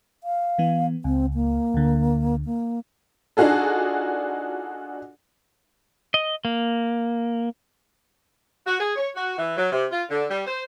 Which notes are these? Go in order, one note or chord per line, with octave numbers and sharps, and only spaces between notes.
F5
E3 B3
C#2 C4
A#3
D2 D3
A#3
D4 D#4 F4 F#4 G#4 A4
D#5
A#3
F#4
G#4
C#5
F#4
E3
F#3
C3
F4
D3
G3
C5